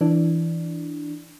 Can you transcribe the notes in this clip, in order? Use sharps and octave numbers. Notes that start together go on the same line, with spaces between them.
E3 D4